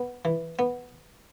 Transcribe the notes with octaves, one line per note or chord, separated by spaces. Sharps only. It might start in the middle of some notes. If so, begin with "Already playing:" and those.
Already playing: B3
E3
B3